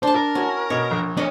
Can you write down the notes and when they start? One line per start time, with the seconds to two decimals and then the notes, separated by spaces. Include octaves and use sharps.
0.03 D4 C5 A5
0.15 A#4
0.35 C#4 E4 F#4
0.70 B2 C#5 D#5
0.91 A#1
1.17 D4 C#5 D#5